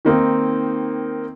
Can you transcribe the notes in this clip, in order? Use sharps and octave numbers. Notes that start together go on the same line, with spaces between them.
D#3 A#3 C4 D#4